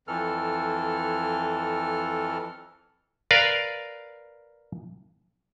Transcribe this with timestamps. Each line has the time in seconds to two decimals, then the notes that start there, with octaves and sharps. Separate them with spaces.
0.08 F2 E3 A4 F6
3.31 A#4 B4 D5 F5